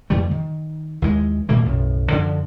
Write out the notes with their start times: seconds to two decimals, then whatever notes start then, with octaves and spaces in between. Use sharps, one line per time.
0.10 F2 E3 G3 A3
0.31 D#3
1.02 D#2 E3 F3 G#3
1.49 A#2 D#3 A3 A#3
1.65 B1 F#2 A2
2.11 F#2 D3 F3 D4